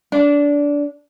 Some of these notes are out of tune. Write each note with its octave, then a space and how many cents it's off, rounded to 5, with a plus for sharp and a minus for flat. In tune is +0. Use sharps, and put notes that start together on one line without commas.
D4 -20